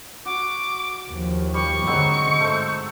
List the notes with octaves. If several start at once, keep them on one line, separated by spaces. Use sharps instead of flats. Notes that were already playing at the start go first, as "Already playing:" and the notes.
F#4 D6
D#2 F3
G3 C#6
G#2 D3 F#3 G#3 C4
G#2 A3 C5